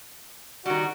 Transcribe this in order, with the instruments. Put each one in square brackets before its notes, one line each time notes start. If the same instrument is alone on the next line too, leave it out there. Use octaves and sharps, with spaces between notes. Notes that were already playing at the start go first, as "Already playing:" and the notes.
[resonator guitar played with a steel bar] D#3 G3 [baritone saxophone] F#4